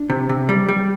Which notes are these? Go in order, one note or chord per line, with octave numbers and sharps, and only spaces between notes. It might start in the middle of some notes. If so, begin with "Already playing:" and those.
Already playing: D4
C3
C3
G3
G3